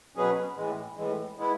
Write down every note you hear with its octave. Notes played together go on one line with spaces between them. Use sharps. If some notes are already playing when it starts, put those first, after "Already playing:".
B2 F#3 C#4 G#4 B4
A2 E3 G#3
A2 E3 G#3
G#3 B3 E4